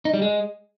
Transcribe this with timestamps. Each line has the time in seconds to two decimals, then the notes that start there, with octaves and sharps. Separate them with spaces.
0.05 D#4
0.14 G3
0.22 G#3